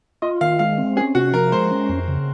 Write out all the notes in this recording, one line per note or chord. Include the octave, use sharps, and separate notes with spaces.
F4 D#5
D#3 F5
G#3 F5
C4
C#4 G#4
C3 F#4
F3 A#4
G#3 C5
C#4
F2
C#3